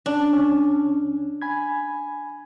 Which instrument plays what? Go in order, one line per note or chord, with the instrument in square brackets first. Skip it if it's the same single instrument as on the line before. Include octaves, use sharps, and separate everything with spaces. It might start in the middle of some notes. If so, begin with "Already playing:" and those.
[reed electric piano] C#4 [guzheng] D4
[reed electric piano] C#2 C#4
G#5 B5 G#6